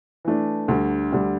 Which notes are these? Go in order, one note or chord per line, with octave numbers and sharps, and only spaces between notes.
E3 A3 D4
D2 D3 G3
D2 D3 G3